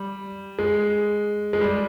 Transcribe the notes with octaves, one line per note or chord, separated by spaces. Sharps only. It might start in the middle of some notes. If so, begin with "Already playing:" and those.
Already playing: G3
G#3
G#3
G3